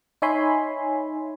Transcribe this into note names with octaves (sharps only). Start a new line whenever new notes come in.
D#4 C#5 E5 G#5 B5 C6